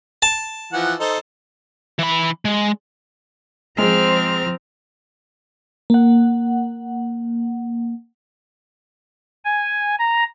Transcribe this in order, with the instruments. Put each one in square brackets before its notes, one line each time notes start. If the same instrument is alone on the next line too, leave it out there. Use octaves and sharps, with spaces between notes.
[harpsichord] A5
[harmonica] E3 F3 F#5
D#4 A4 C5
[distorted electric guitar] E3 B5
G#3
[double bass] F3 [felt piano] G#3 [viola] C4 [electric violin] A#5 F6
[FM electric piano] A#3 F#5
[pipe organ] G#5
A#5